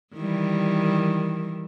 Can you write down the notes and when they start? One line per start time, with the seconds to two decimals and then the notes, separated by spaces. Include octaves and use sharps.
0.15 D#3 E3 G3